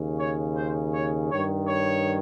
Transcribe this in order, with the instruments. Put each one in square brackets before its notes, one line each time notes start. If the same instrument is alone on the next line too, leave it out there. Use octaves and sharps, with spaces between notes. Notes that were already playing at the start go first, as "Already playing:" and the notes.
Already playing: [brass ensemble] D#2 C#3
C#5
C5
C#5
G2 D#3 C#5
C#5